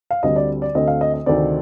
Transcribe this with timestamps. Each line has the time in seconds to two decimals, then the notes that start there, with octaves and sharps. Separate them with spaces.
0.11 F5
0.23 D2 D3 G3 C4 D#5
0.36 D5
0.62 D5
0.75 D2 D3 A3 C4 D#5
0.88 F5
1.01 D#5
1.14 D#5
1.26 D2 C3 D#3 A3 C4 D5